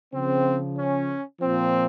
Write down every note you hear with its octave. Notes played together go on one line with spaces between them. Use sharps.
C#3 F3 C4
C#4
A#2 F3 C4